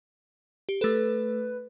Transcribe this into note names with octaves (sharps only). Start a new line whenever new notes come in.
G4
A3 A4 B4